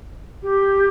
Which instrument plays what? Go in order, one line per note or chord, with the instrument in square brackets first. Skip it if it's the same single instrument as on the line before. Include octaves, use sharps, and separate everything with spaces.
[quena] G4